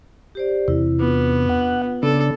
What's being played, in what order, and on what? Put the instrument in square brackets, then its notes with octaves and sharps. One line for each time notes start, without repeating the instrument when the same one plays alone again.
[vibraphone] G4 C5 D5
[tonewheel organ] E2 C3 [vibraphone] E4
[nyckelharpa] B3 [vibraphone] D4 F4
[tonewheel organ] F#5
[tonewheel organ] C#3 D4 [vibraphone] B3 [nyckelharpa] A4